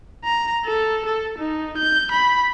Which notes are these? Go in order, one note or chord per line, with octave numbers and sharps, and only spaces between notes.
A#5
A4
A4
D#4
G6
B5